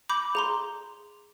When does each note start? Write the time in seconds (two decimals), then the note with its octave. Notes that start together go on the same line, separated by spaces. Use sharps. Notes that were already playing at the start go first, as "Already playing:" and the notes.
0.09 B5 D6 G6
0.35 G#4 A#5 C6